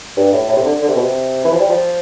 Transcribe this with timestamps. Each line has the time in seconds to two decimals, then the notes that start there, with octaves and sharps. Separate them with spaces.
0.17 G2
0.33 A2
0.49 A2
0.56 C3
0.65 D3
0.81 D3
0.89 C3
0.95 B2
1.02 C3
1.45 E3
1.52 F3
1.60 G3
1.69 F3